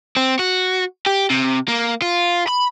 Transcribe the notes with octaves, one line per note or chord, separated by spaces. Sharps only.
C4
F#4
G4
C3
A#3
F4
B5